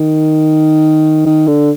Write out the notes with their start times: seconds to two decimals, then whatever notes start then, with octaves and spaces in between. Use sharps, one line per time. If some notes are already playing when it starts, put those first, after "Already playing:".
Already playing: D#3
1.26 D#3
1.48 D3